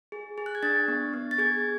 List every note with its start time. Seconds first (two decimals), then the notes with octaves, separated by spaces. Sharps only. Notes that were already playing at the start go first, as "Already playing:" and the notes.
0.12 G#4
0.38 G#4
0.46 F#6
0.55 G#6
0.63 D4 A6
0.88 B3
1.13 B3
1.31 A6
1.38 G#4 G#6